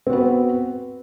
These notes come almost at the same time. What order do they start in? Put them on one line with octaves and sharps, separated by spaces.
C4 F#4 B3